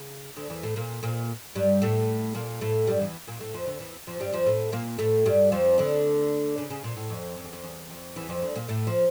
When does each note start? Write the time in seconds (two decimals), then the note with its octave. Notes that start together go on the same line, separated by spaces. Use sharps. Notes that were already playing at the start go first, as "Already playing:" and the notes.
Already playing: C#3
0.36 D2 D3
0.50 E2 E3
0.63 A2 A3
0.76 A#2 A#3
1.03 A#2 A#3
1.55 G2 G3
1.82 A2 A3
2.35 A#2 A#3
2.61 A2 A3
2.87 G2 G3
3.01 E2 E3
3.27 A#2 A#3
3.40 A2 A3
3.54 F2 F3
3.67 D2 D3
3.80 E2 E3
4.07 F2 F3
4.20 G2 G3
4.33 F2 F3
4.46 A2 A3
4.72 A#2 A#3
4.99 A2 A3
5.26 G2 G3
5.52 F2 F3
5.78 D2 D3
6.58 C#3
6.70 C#3
6.84 A#2
6.97 A2
7.10 F2
7.37 F2
7.44 E2
7.53 F2
7.64 E2
7.90 F2
8.16 E2 E3
8.29 F2 F3
8.42 D2 D3
8.55 A#2 A#3
8.69 A2 A3
8.87 F3